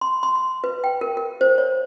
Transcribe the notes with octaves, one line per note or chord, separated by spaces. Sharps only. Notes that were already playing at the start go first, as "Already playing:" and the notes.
C6
C6
C6
B4
G5
A#4
A#4
C5
C#5